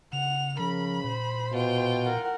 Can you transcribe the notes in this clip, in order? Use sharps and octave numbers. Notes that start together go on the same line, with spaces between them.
C#3 F#5 F7
C#3 F3 A#4 B5
A#2 C5
B2 F4 G5
A#4 F#5